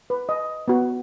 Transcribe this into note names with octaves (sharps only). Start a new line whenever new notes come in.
B4
D#5
B3 F#4